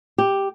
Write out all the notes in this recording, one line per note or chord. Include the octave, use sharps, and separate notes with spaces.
G4